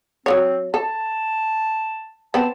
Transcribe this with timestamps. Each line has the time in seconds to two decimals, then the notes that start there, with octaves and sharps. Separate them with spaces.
0.26 F#3 A#3 C4 C#5
0.74 A4 A5
2.34 B3 C4 A5